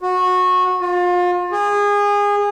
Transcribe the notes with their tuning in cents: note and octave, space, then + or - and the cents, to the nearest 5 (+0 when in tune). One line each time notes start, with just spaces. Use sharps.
F#4 -20
F4 +30
G#4 -25